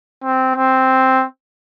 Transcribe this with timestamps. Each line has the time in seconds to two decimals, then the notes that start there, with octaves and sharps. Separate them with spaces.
0.23 C4
0.56 C4